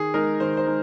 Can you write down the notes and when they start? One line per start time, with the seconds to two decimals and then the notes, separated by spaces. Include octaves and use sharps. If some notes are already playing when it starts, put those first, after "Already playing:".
Already playing: D#3 G#4
0.14 G#3 D#4 A#4
0.40 D#3 C5
0.57 C5
0.66 G#3 D#4